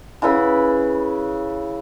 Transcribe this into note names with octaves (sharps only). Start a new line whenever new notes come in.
C#3 E4 B4 B5